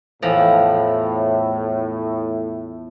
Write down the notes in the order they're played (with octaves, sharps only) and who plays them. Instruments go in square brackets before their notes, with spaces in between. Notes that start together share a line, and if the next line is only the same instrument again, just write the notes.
[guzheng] E2 F3 A#5 [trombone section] A2